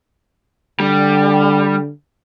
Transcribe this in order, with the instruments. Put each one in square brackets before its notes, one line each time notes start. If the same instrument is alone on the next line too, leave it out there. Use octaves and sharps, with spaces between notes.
[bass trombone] D3 [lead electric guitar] G3